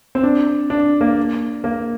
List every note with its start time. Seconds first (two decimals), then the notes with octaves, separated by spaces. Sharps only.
0.15 C4
0.23 D4
0.70 D4
1.01 A#3
1.64 A#3